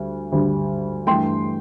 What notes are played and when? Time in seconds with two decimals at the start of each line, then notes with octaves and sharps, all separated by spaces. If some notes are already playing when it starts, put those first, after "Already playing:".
Already playing: D2 G3
0.32 D2 D3 G3
1.07 G2 E3 A3 G5 C6